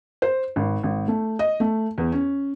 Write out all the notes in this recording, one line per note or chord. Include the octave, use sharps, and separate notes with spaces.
C5
G#1
G#1
A3
D#5
A3
E2
C#4